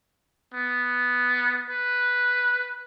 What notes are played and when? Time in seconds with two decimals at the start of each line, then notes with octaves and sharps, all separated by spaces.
0.54 B3
1.70 B4